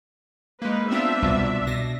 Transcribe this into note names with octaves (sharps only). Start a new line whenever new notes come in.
G#3 A#3 D#4 B4
B3 C4 D4 F4 E5
C2 B2
B2 A#6